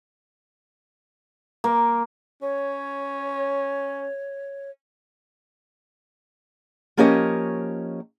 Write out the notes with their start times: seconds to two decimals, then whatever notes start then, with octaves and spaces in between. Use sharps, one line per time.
1.64 A#3
2.42 C#4 C#5
6.97 F3 A#3 C#4 G4 C#5 D#5